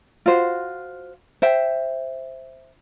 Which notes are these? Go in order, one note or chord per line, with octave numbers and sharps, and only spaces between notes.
F4 F#4 C5
C5 E5 G5